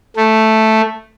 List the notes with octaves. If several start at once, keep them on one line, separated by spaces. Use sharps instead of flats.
A3